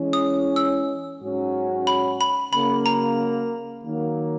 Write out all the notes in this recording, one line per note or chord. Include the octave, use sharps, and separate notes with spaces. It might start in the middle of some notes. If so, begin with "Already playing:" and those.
Already playing: E3 G#3 C#4
D#6
E6
G#2 F#3 C#4 F#4
B5
B5
C#3 F#3 A#3 B5
A#5
D#3 F#3 A#3